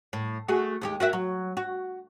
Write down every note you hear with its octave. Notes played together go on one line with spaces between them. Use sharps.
A2
A3 F#4 G#4
D#2 G#3 G4
F#4 A#4 E5
F#3
F#4